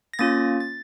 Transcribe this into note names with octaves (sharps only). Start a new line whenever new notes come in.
A#6
A#3 C#4 F4 A6
A6